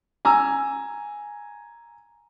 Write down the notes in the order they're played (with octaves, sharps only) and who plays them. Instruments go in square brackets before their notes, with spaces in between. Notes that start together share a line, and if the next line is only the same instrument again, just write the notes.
[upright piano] G#5 A#5 E6